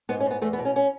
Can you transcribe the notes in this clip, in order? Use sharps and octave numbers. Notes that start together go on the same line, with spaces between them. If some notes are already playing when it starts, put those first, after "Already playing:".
G#2 B3
C#4
G#2 B3
E2 A3
B3
B2
C#4
C#4